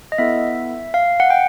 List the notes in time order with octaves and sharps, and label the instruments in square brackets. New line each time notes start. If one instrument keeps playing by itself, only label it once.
[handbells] D#5
B3 E4 A4 E5
F5
F#5
G5